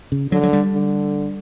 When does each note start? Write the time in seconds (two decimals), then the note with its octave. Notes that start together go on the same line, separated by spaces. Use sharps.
0.12 C#3
0.32 D3 F#3
0.43 F#3
0.53 G3
0.73 D3